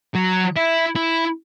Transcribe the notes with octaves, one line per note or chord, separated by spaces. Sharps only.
F#3
E4
E4